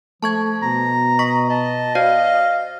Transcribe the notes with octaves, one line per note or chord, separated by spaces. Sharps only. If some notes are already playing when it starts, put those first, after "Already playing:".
F3 A3 A5 C#6 G#6
B2 A#5
D#5 C#6 B6
D#5 A5
F#4 C5 D5 F5